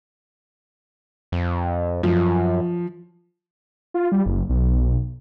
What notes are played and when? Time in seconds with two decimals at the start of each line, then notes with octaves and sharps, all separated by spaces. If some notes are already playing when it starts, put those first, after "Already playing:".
1.32 F2
2.03 F#2 F3
3.94 F4
4.12 G3
4.26 F#1
4.49 B1